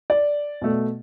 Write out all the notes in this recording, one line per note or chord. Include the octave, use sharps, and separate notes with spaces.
D5
B2 A3